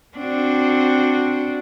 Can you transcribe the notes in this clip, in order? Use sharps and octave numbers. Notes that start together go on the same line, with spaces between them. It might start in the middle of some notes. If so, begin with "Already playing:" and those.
C4 D4 F#4